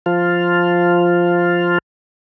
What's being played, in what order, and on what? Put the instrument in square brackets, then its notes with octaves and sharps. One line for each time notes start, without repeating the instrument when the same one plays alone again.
[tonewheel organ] F3 F4